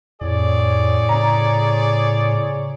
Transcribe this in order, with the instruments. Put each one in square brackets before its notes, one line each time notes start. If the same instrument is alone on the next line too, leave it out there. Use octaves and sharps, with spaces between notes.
[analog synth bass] F2 [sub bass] A2 [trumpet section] G#4 C#5 D5
[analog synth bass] C#3 [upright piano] A#5